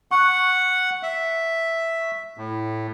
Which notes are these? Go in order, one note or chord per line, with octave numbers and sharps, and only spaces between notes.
F#5 C#6 F#6
E5
A2